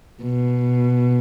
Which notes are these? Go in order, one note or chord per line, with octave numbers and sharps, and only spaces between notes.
B2